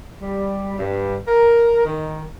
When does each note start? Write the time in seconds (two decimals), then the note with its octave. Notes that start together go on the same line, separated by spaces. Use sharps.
0.22 G3
0.79 G2
1.28 A#4
1.85 D#3